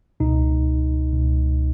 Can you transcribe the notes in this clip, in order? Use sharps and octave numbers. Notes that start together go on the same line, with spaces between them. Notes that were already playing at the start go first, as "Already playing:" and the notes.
C#2 B2 D#4
C#2 B2